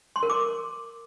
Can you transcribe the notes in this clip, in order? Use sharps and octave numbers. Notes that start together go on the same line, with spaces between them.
C6
A#4
D6